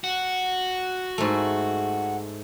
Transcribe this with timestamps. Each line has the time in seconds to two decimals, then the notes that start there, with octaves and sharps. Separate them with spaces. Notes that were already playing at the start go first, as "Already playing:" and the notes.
0.04 F#4
1.18 G#2 A3